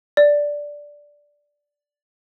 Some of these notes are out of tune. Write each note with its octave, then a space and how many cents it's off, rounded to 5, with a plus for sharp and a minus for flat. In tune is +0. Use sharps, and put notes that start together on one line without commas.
D5 -5